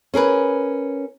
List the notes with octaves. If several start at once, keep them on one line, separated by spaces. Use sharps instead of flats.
C#4 G#4 A#4 B4